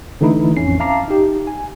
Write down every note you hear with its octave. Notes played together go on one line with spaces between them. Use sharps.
D3 E3 A3 D#4 E4
A1 F2 C#4 C7
E5 F5 A5 A#5 D6 C7
D#4 G4
G#5